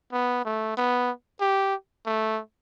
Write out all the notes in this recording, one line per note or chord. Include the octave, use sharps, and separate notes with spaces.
B3
A3
B3
G4
A3